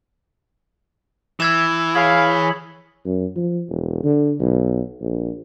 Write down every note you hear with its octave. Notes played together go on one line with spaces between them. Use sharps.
E3 E6 G#6 E7
G#4 C#5 F5 B5
F#2
F3
E1
D3
B1
A#1